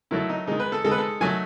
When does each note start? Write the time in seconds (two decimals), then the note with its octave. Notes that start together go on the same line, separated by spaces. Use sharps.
0.11 D#3 F#3 A3 E4
0.29 D#4
0.47 D#3 G#3 D#4
0.60 B4
0.72 A4
0.84 D#3 G#3 A4
0.91 B4
0.98 A4
1.21 D#3 F#3 A3 G#5